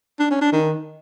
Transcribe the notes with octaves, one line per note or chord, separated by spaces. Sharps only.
D4
C#4
D4
D#3